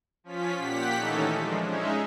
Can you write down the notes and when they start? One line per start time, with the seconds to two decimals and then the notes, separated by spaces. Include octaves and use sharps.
0.24 F3 C#4 F4 B6
0.57 A#2 G4 F#5 B6
0.96 D#3 E3 A3 C#4 D#4 A4
1.33 F3 G#3 D4
1.64 G#3 C#4 D#4 E5